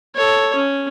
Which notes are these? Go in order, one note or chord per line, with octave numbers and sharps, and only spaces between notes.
A4 C#5
C#4